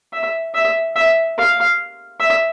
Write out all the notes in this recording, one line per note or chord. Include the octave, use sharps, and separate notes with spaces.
E5
E5
E5
F5
E5